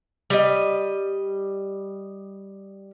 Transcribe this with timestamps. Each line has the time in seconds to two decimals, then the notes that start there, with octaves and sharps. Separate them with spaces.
0.30 G3 D#5